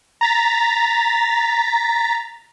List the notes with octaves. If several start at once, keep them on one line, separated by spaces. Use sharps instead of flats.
A#5 A6 B6